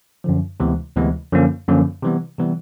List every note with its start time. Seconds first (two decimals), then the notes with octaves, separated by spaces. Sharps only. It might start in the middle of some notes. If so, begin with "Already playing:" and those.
0.24 F#2 D3 F3
0.60 D2 C3 E3 G#3 B3
0.96 D2 C3 E3 G#3 B3
1.32 F#2 D3 F3 A#3 C#4
1.68 F#2 D3 F3 A#3 C#4
2.03 C3 E3 G3 B3
2.39 C3 E3 G3 B3